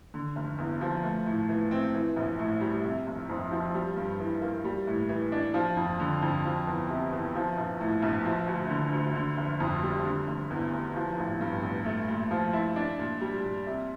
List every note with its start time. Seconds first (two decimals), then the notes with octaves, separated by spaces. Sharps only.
0.14 D3
0.36 F1
0.58 E2
0.81 F3
1.04 A3
1.26 A2
1.49 E3
1.71 C4
1.94 E3
2.16 A#1
2.39 A2
2.61 G3
2.84 C3
3.07 F1
3.29 F2
3.51 F3
3.74 G3
3.96 G2
4.20 E3
4.41 A#3
4.65 G3
4.87 A2
5.09 E3
5.32 D4
5.54 F3
5.77 F2
6.00 D3
6.22 F2
6.45 F3
6.67 E2
6.90 C3
7.12 E2
7.35 F3
7.57 A#1
7.80 A2
8.02 A#1
8.25 F3
8.47 D2
8.70 D3
8.93 D2
9.15 D3
9.37 F1
9.60 F2
9.83 G3
10.05 D3
10.28 F1
10.50 E2
10.73 F1
10.95 F3
11.18 A1
11.41 G2
11.63 A1
11.85 A3
12.08 A#2
12.31 F3
12.53 E4
12.76 D4
12.99 A#2
13.21 G3
13.43 A#2
13.67 C3